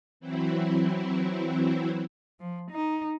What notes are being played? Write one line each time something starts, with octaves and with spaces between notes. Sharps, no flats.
E3 F#3 C4 E4
F3
D#4